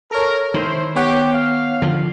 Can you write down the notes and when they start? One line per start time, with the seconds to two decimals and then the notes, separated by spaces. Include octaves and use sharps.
0.11 A4 A#4 C#5
0.54 D#3 E4 C5
0.95 B3 G4 C#5 F#5
1.33 F5
1.82 D3 F3